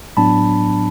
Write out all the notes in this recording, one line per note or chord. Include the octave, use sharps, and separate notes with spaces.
A2 F#3 B3 D4 A5 B5